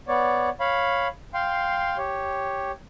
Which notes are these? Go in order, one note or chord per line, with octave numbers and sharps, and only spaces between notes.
B3 C#5 D5
C#5 F5 B5
F5 G5 C6
G4 C#5